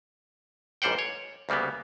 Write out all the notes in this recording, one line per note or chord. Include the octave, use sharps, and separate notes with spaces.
A1 G#2 G3 C5 F#5 G5
C#5
D2 C#3 G3 A#3 B3